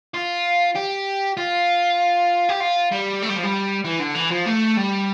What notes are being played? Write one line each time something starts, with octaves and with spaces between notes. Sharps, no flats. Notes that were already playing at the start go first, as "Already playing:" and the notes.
F4
G4
F4
G4
F4
G3
A3
G3
F3
G3
E3
D3
E3
F3
A3
G3